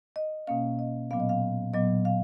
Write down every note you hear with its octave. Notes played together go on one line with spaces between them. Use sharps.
D#5
B2 A#3 C#4 F5
D#5
A#2 F#3 B3 F5
D#5
F5
A#2 F#3 B3 D#5
F5